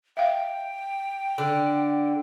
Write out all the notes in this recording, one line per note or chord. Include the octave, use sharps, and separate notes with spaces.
E5 F5 G5
D3